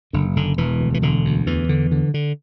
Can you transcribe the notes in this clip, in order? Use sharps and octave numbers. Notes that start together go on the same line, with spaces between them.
F#1 D3
F#1 D3
E1 E3
D2
E3
E1 D3
D2
E2 E3
D3
D3
D3